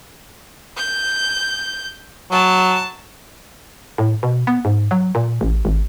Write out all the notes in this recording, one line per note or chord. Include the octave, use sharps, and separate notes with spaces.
G6
F#3 A5
A2
B2
B3
G#2
F#3
A#2
A1
G#1